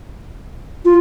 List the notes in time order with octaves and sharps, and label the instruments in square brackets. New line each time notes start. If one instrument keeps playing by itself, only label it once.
[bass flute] F4